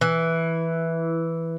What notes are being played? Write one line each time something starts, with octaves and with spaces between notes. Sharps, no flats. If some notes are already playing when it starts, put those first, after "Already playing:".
E3